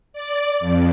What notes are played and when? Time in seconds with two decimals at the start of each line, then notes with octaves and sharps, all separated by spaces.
0.13 D5
0.60 F2